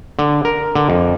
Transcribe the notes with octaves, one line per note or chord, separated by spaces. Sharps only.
D3
A#4
D3
F2